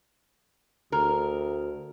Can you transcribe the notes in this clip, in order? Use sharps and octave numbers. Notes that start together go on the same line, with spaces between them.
D2 A#4